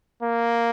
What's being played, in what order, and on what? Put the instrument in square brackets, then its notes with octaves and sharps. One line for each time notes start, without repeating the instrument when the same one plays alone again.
[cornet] A#3